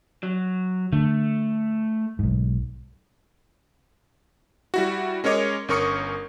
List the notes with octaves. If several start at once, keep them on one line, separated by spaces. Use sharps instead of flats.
F#3
D3 A3
B1 G#2
G3 E4 F#4
G#3 C#4 A#4 C#5 D#5 D6
G1 C#4 A#4 C#6 D#6 C#7